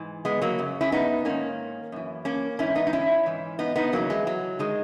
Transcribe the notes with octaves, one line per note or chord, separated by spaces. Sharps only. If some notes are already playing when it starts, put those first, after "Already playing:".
Already playing: G#2 E3
G#3 B3
F#3 A#3
F#2 C#3
C#4 E4
B3 D#4
G#2 D#3 A#3 C#4
F#2 E3
A#3 C#4
G#2 E3 C#4 E4
B3 D#4
D#4
C#4 E4
G#2 E3
B3 D#4
B3 D#4
E2 C#3 E3 F#3 A#3
G#3
F#3
D#3 G#3